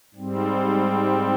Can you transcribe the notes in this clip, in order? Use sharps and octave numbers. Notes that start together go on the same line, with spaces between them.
G#2 G3 C4